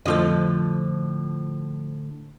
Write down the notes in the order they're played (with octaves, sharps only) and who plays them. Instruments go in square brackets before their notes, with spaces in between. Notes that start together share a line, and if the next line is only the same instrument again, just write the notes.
[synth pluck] F2 F4 A4 [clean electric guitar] A2 D3 [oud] F3 D#5